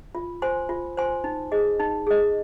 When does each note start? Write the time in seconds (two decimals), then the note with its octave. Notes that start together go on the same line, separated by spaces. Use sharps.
0.15 F4
0.42 C5 G#5 C6
0.69 F4
0.98 C5 G#5 C6
1.24 D#4
1.52 G#4 D#5
1.80 D#4
2.07 G#4 D#5